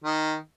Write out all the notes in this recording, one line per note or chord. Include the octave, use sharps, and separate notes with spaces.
D#3